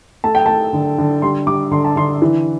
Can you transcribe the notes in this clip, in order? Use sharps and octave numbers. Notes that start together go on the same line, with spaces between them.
A3 A5
G5
A3 A5
D3
D3
G3 C6
G3 D6
D3 C6
A5
D3 C6
E3